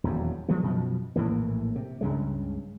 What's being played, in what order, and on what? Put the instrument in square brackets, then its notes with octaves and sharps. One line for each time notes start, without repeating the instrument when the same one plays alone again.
[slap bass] D#1 E2 G2 F#3
F3 G3 G#3 B3
F#2 B2 F3
A#1 A2 E3 A#3
C3
C#2 G2 C#3 G#3